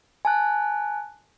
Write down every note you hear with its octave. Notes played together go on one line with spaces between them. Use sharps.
G#5 A5 F#6